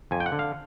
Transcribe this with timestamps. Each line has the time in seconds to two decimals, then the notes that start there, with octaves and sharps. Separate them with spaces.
0.11 F2 G#5
0.20 G5
0.26 F#5
0.32 D3
0.39 F5